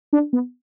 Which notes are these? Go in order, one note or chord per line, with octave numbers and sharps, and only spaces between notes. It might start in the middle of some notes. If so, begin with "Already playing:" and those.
D4
B3